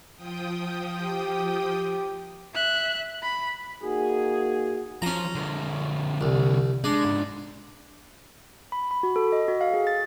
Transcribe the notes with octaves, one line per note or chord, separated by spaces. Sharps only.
F3 G5 D#6
G4
E5 F#6
B5
A#3 D#4 F#4 G#4
F3 C#4 A#5
D3 F3
C2
G#3 D4
G#2 C#3
B5
B5
F#4
A4
D#5
F#4
F5
G#4
A6